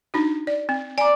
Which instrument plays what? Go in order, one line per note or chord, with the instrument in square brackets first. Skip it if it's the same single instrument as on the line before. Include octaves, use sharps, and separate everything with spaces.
[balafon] D4 D#4 F#4
D5
C4
[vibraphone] D5 D6 [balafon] G#5 A#5